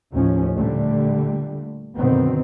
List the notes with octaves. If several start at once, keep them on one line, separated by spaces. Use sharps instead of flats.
D#2 A2 F3 C#4
A#2 D3 G3 A3
F#2 B2 D3 D#3 B3 C4